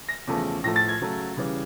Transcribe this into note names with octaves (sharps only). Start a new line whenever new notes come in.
A#6
E2 C#3 F3 A3
A2 F3 A3 A#6
A6
G#6
C#3 F#3 A3
C#3 E3 G3